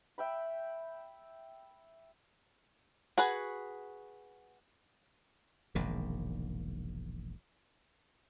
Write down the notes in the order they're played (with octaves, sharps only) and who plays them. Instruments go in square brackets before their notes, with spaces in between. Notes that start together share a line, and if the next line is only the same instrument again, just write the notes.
[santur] E5 G5 B5
[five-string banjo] F#4 G#4 B4 F#5
[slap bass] E1 A#1 G#2 D#3